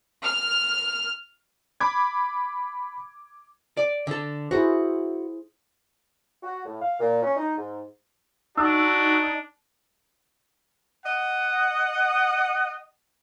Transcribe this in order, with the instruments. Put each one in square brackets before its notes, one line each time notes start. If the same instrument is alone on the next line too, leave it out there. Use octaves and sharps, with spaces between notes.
[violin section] F6
[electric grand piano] B5 D6 G#6
[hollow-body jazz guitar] D5
D3 A4
[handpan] E4 G#4 C5 [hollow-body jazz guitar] F#4
[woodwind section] F#4
A2
F5
A#2
C#4
D#4
G#2
[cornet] D4 [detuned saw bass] D#4 [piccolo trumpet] F#4 [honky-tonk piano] E6
[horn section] D#5 F#5